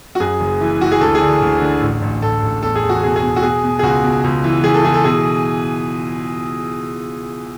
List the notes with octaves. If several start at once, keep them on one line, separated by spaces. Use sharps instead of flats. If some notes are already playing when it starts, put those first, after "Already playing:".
F#4
F#2 G#4
F#1
E3
E3 F#4
G#4
D2 A4
G#4
D3
D2
D3
A1
A1
A1 A4
A1
E2 A4
G#4
E2
F#4
B2 G#4
G#4
B2
F#4
B2 G#4
B2
G#4
C#2 F#4
B2
C#2
E3
E3 G#4
A4
E3 G#4
A4
B2 G#4